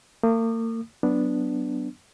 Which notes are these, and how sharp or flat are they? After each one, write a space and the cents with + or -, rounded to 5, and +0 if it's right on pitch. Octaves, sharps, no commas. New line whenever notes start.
A#3 -45 D#6 -35
F#3 +15 B3 +0 D4 +0